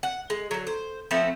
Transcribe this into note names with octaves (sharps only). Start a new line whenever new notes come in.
F#5
G#3
D3 F#3
C5
F3 A3 B3 C4